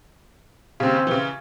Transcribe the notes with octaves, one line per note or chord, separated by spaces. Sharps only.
D#2 C#3 C4
C#3 E3